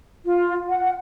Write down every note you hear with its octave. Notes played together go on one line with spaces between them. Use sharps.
F4
F#5